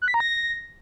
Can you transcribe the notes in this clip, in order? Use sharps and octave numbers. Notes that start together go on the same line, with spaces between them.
F#6
B6
A#5
A#6